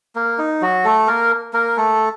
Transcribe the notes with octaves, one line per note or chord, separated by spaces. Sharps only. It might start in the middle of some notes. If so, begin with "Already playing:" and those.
A#3
D#4
F#3 F#4
A3 A4
A#3 A#4
A#3 A#4
A3 A4